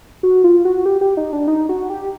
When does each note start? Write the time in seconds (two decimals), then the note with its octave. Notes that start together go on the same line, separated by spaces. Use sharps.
0.23 F#4
0.44 F4
0.65 F#4
0.85 G4
1.01 G4
1.17 D#4
1.33 D4
1.48 D#4
1.69 F#4
1.90 G4